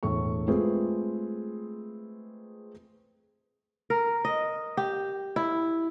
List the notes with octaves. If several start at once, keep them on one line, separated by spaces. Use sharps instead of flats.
E1 A2 A4 C#6
G#3 A3 C4 F4 G#4 B4
A#4
D#5
G4
E4